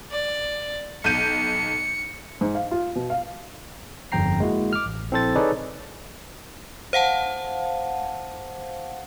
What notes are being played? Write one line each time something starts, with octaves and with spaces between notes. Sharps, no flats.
D5
B1 G6 C#7 D#7
G#2
F5
F4
B2
F5
G1 F2 C4 G5 A#5 C7
G#3 A#3 E4 F#4
D6 F6
A1
A#1 C4 E4 A4 C5 A6
D#4 G#4 A4 B4 C#5 D5
C5 F5 F#5 A5